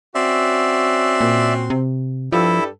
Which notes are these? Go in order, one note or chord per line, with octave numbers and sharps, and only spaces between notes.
C4 C#4 F#4 D5 E5
A#2
C3
G2 F3 G3 E4 A4 E5